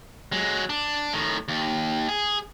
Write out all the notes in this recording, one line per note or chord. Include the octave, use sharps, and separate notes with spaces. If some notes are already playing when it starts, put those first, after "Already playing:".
F#3 G#3
D4
A2 D#3
D#2
G#4